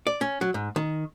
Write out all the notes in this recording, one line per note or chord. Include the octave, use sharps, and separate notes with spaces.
D5
C#4
F#3
G#2
D#3